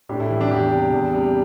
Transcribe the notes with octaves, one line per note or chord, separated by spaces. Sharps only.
A2 D4 G4
E4 A4
E3 G3
D4 G4
E2 D4 G4
C3 G3
E2
C3 G3